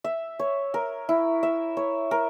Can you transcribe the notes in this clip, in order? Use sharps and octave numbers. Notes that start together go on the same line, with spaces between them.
E5
C#5
A#4
E4
E5
C#5
A#4